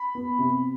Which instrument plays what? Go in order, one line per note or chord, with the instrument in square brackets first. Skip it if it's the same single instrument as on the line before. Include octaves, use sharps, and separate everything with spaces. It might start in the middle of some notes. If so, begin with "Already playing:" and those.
Already playing: [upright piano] B5
B3
C3